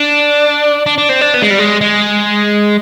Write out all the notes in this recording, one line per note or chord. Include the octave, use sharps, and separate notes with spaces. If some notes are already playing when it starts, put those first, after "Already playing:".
Already playing: D4
D4
D4
C4
D4
B3
G#3
G3
G#3
G#3